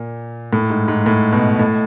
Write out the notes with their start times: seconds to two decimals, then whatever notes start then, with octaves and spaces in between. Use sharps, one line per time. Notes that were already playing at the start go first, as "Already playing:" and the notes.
Already playing: A#2
0.53 A2
0.70 G#2
0.88 G#2
1.06 A2
1.32 B2
1.59 A2